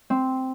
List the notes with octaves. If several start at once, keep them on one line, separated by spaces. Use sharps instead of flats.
C4